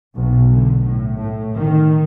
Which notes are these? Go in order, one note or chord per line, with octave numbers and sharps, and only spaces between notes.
B1
D3
A2
A2
D#3